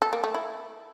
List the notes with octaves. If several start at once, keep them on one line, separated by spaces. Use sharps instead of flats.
A4
A#3
A3
E4